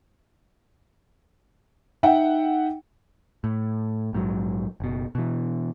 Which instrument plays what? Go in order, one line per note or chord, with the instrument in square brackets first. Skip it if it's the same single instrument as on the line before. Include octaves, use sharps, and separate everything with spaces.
[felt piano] D#4 E5 F#5 G5
[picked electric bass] A2
A#1 G#2 C3 F#3
F#1 B2
B2 E3